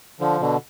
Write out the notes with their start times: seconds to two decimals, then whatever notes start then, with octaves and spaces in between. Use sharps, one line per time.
0.20 D3 F3
0.41 B2 D3